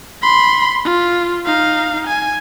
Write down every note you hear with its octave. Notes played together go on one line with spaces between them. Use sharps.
B5 C6
F4
D#4 F5
G#5